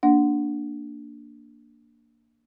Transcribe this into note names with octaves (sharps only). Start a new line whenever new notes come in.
A#3 D4 F#5